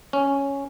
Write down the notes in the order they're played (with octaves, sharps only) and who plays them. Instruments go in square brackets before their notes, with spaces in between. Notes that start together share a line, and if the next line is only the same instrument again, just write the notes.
[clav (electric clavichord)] C#4